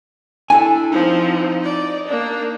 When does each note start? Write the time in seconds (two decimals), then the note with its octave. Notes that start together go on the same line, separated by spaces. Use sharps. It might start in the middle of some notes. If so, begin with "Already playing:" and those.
0.50 D4 E4 A4 G#5
0.92 F3 C4 D#4
1.64 D5
2.07 A#3 D4